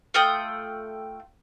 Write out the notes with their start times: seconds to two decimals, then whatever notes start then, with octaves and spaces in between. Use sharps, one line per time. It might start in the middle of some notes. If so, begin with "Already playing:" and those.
0.14 A3 F4 G5 D#6